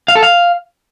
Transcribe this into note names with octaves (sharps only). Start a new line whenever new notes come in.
F5
A4
F5